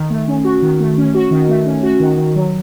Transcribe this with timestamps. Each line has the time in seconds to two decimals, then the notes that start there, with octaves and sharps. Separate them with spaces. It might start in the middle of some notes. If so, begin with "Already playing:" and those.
Already playing: D#3
0.10 A3
0.28 C#4
0.45 F#4
0.63 D#3
0.80 A3
0.98 C#4
1.15 F#4
1.31 D#3
1.49 A3
1.66 C#4
1.83 F#4
2.00 D#3
2.17 D#3
2.36 F#3